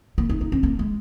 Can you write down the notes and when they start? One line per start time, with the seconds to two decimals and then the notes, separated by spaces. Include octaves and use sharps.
0.18 A#3
0.29 D#4
0.41 D#4
0.52 C#4
0.63 A#3
0.79 G#3